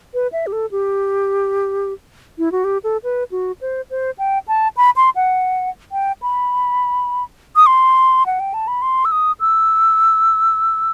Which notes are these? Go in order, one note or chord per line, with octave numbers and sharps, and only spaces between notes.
B4
E5
G4
A4
G4
E4
F#4
G4
A4
B4
F#4
C5
C5
G5
A5
B5
C6
F#5
G5
B5
D#6
C6
F#5
G5
A5
B5
C6
E6
D#6
E6